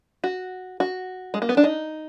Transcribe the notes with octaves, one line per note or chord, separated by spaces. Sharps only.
F#4
F#4
G#3
A#3
B3
D4
D#4